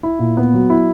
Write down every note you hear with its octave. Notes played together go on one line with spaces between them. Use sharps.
E4
A#2
B3
F#3
E4